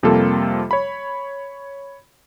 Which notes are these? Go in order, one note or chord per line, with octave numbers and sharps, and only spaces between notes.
F2 C3 G3 A#3 F4 A4
C#5 B5